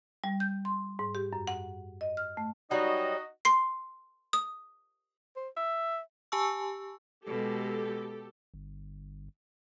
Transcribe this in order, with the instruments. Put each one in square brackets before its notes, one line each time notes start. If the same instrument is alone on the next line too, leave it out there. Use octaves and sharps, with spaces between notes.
[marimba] G3
G6
C6
G#2
G4
F#2
F#5
D#5
F6
A3
[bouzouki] F#3 G3 [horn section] D#4 F#4 [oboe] D#5
[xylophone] C6 C7
D#6
[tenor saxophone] C5
E5
[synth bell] G4 G#5 A5 C#6 E6
[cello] B2 G#3 [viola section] G4 A4
[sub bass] G1